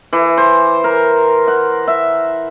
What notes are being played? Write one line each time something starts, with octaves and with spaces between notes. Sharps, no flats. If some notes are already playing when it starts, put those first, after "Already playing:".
E3
C5
A#4
F#5
E5